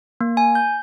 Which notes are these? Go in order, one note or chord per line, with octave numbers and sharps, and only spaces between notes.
A#3
G#5
G6